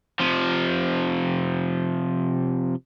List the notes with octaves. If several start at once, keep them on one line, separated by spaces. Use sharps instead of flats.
C3 F3